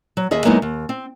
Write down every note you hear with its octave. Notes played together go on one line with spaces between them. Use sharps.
F#3
D#2 G#4 D#5 E5
F#3 G#3 A#3 B3 D#4 E4
D#2
C4